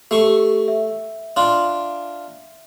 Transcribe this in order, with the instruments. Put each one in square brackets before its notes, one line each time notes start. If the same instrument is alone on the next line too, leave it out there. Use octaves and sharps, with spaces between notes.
[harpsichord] A3 C#6 [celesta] G4
[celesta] E5
[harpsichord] D4 F4